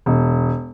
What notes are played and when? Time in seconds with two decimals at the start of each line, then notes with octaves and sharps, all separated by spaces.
0.06 E1